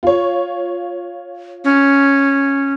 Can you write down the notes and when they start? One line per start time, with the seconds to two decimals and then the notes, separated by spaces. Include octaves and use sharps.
0.03 F4 C#5
1.64 C#4